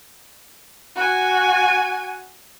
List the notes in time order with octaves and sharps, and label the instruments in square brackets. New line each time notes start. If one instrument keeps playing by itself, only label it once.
[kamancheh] F#4 G#5